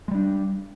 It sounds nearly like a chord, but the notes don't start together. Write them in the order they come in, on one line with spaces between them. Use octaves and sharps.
G#3 G3 D4